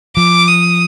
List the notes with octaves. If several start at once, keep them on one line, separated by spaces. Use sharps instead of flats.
F3 D6
D#6